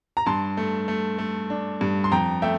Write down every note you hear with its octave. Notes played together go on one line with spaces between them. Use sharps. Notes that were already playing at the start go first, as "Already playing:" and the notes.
A#5
G2 A5 C6
A3
A3
A3
D4
G2
C6
F2 G5 A#5
A3 E5 G5